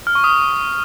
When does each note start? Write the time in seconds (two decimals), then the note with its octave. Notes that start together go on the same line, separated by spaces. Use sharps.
0.07 F6
0.15 C#6
0.24 D#6